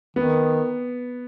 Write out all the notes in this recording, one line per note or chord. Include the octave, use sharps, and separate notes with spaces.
D#3 B3